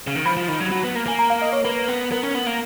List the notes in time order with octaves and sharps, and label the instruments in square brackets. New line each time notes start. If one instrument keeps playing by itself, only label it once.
[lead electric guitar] C#3
D#3
[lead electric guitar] F3 [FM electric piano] B5
[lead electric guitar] F3
D#3
F#3
F#3
B3
A#3
[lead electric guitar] A#3 [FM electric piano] G#5
[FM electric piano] A#5
F5
D#5
C#5
[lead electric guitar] A#3 [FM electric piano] B4
[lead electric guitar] B3
[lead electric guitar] B3 [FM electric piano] A#4
[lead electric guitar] C#4
B3
A#3